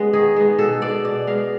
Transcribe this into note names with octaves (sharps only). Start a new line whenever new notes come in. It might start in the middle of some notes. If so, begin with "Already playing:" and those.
Already playing: G#3 B3 C#4
D#3 G#4
G#3 B3
B2 A4
G#3 B3 D5
B2 D5
G#3 B3 F5